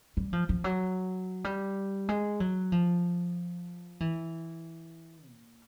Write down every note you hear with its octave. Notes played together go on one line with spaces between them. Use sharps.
G3
F3
F3
F#3
G3
G#3
F#3
F3
E3
A#2